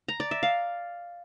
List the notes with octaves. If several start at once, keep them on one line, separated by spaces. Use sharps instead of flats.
A#5
D5
E5
F5